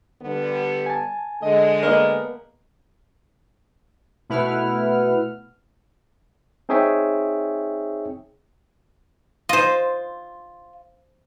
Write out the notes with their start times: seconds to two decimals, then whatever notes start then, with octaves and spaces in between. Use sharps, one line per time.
0.22 D3 G3 B3
0.86 G#5 A5
1.43 D3 G#3 D#5
1.83 A#3 B3 A#4 D#5
4.29 B2 A3 E4 B4 F#5 F6
6.69 C4 D#4 G#4 C#5 E5 G5
9.49 F4 C5 D#5